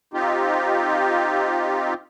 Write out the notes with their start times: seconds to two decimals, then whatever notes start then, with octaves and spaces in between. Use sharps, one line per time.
0.14 C4 D#4 F4 G4